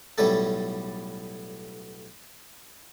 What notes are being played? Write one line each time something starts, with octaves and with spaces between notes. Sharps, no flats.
B1 A2 G3 A3 A4